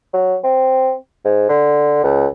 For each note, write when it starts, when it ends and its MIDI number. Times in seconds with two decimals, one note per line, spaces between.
0.13 0.36 54
0.44 0.93 60
1.25 1.48 44
1.49 2.02 50
2.03 2.27 37